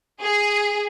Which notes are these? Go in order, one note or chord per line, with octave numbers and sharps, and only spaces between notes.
G#4